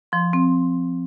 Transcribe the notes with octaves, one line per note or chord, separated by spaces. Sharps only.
F3 C6
C4